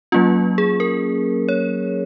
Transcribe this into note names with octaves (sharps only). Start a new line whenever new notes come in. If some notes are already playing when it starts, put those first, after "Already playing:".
F#3 A#3 C#4 F4
G#4
A#4
C#5